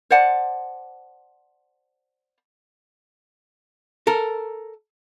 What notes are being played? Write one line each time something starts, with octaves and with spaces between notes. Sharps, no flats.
C5 D5 F#5 A5
A4 A#4